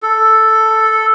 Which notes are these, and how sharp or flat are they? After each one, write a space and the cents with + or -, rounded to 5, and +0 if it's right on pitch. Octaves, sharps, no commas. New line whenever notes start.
A4 +0